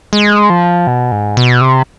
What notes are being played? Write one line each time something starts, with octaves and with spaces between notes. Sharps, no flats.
G#3
F3
B2
G#2
B2
C3